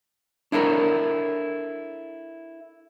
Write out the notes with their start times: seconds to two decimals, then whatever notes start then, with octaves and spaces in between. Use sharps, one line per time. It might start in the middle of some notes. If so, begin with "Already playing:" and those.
0.52 D4 E4 A4 A#4 C#5